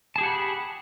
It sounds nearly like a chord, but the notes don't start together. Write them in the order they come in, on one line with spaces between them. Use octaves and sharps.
A5 G#4 G4 F#5 B5